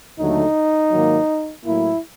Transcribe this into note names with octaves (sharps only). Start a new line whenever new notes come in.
D#2 D3 F#3 A3 D#4
G#2 D#3 F#3 A#3
A2 F#3 A#3 E4